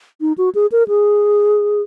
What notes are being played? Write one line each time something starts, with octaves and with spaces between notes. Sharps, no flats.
D#4
F#4
G#4
A#4
G#4